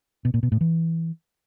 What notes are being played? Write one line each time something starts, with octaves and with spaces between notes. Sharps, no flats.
B2
A#2
B2
A2
E3